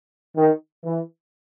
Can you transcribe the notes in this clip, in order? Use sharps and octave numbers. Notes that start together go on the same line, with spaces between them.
D#3
E3